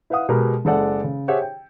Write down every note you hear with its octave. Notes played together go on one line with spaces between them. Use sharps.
E4 B4 F5 F#5 D#6
B2 G#3 B3 G4 A#4
F#1 G#3 A4 D5 F#5
C#3
G4 G#4 C5 C#5 E5 F#5
G5